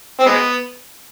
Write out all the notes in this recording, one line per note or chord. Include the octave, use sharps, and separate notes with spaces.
C4
G#3 B3